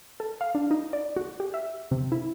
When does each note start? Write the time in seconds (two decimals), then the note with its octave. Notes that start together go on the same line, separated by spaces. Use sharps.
0.20 A4
0.41 F5
0.55 D4
0.71 D#4
0.93 D5
1.16 F#4
1.40 G4
1.54 E5
1.91 C3
2.12 E4